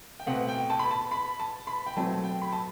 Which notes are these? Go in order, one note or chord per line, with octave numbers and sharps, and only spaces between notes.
G5
B2 A3 C4 F#5
G5
A5
B5
A5
B5
A5
B5
G5
B2 F#3 A3 C4 A5
A5
G5
B5
A5